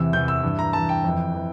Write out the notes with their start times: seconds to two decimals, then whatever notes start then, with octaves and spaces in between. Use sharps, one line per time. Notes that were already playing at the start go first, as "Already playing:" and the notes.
Already playing: E2 C3 E3 E6
0.13 E2 C3 E3 G6
0.28 E6
0.43 G2 E3
0.59 A#5
0.73 G2 E3 A5
0.89 G5
1.04 F2 E3
1.34 E3